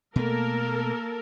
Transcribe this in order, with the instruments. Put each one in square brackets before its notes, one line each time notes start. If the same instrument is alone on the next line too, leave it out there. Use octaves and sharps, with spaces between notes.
[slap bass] B2 A3 [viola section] A#3 A4 A#4